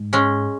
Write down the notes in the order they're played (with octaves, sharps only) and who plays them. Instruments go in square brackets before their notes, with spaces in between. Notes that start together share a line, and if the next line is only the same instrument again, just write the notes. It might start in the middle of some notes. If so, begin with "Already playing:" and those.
Already playing: [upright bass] G#2
[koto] G#3 C#4